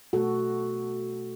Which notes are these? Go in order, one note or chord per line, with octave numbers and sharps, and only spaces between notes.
B2 A3 F#4 A4